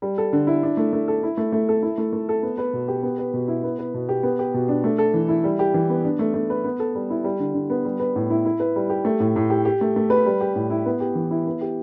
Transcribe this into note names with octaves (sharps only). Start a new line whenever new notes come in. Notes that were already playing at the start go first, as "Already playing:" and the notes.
G3
A4
D3
E4
D4
A3
A3
A4
E4
A3
A3
A4
E4
A3
A3
A4
B3
B4
B2
G4
B3
B4
B2
E4
B3
B4
B2
G4
B3
G4
B2
D4
A3
A4
E3
E4
G3
G4
E3
B3
D4
A3
A3
B4
B3
A4
G3
E4
G3
D3
D3
B3
G3
B4
A2
E4
E4
B4
G3
G4
A3
A2
A2
G4
G4
A3
A3
B4
G3
G4
A2
E4
B3
G4
E3
E4
B3
G4